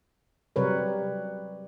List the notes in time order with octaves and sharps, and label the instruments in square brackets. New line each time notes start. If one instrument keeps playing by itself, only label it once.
[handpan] C3 F#3 G3 A#4 B4 C#5